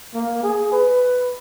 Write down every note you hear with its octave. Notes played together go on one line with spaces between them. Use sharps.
A#3
G#4
B4